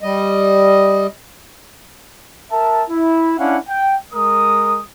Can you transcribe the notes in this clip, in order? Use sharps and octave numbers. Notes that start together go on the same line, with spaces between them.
G3 D#5
A#4 E5 A5
E4
C#4 D4 E4 F5 F#5
G5
G#3 A#4 D#6